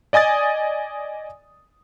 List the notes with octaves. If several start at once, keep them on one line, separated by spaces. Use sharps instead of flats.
D5 D#5 G#5 D#6 A6